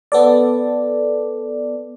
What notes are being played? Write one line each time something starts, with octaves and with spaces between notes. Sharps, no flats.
B3 A4 D5